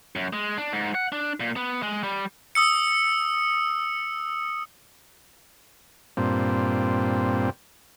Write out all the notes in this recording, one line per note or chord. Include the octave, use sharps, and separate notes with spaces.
F#2
G#3
D4
G#2
F#5
D4
A#2
B3
G#3
G3
D#6 E6 C#7
G2 A#2 C4